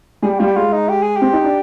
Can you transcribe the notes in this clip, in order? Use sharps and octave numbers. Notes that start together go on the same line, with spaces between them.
G3 G#4
G4
G3 F4
G4
G#3 F4
D#4
G4
G#4
G4
C4
D#4
D4